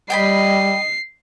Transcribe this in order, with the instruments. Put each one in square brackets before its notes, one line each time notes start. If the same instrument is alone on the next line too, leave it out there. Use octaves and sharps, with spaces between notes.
[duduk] G3 [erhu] D#5 [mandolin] G5 G#5 B5 [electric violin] C7